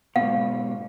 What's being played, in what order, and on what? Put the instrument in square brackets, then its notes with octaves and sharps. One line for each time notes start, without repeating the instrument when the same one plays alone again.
[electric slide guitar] G#2 B2 [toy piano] F5